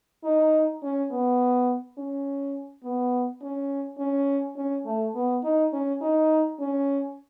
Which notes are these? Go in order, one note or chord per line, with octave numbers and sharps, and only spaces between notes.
D#4
C#4
B3
C#4
B3
C#4
C#4
C#4
A3
B3
D#4
C#4
D#4
C#4